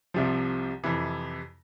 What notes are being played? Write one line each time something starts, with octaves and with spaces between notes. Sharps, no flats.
C2 C3 F3
F2 C3 E3